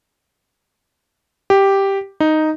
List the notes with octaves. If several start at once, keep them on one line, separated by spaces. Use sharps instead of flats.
G4
D#4